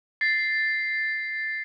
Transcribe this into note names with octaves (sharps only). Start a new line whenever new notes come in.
A6 C7